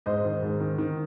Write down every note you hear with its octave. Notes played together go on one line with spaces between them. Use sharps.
G#2 C5 D#5
D#3
G#2
D#3
D#3